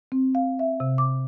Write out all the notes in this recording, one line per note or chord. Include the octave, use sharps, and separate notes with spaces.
C4
F5
E5
C3
D6